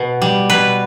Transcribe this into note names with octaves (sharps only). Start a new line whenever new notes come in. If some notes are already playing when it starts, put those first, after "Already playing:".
Already playing: B2
G3
B2 B4